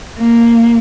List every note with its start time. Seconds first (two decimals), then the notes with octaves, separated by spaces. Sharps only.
0.18 A#3